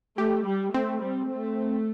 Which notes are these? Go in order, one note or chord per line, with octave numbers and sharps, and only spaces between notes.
A3 G4
G3
A3 C4
G3
A3